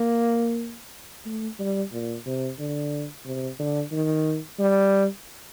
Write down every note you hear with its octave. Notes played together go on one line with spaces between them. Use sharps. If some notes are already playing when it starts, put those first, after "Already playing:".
Already playing: A#3
A3
G3
A#2
C3
D3
C3
D3
D#3
G3